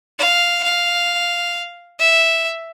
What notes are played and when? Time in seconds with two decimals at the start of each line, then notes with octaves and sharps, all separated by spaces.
0.18 F5
0.63 F5
1.99 E5